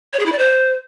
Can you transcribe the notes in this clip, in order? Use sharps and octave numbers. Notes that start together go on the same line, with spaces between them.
C#5
G#4
E4
D5
C5